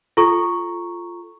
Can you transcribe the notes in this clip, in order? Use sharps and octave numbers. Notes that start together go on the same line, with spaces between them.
F4 A4 A#5 C#6